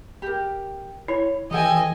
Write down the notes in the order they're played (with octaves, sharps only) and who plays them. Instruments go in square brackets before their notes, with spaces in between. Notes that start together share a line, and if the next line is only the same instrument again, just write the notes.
[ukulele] G4 A#4
[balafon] E4 [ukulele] C#5
[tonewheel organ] E3 [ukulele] G4 A4 G5 [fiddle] D#5 G#5